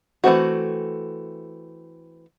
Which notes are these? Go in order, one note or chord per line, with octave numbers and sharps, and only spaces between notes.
E3 A3 C4 F#4